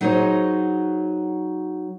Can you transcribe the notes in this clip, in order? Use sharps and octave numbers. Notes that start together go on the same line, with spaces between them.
F#3 D#4 G#4 C5 C#5